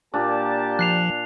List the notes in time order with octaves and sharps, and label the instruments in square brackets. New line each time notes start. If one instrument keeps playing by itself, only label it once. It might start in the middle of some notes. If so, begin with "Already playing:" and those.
[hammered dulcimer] A#2 D4 D5 [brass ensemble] A#3 G4 A5
[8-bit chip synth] F3 [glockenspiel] F#6 C7 F7